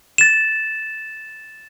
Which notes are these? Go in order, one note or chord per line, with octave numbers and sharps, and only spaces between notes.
A6 E7